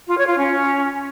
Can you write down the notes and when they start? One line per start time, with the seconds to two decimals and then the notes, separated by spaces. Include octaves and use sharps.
0.07 F4
0.17 C#5
0.27 F4
0.37 C#4